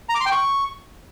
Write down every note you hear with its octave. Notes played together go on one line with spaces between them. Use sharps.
A#5
D6
C6
G5
C#6